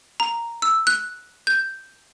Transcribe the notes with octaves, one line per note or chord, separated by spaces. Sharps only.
A#5
E6
F#6
G6